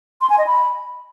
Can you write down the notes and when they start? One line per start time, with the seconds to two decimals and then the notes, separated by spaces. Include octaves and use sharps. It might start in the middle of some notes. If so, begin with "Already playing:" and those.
0.21 C6
0.30 G#5
0.38 D#5
0.47 B5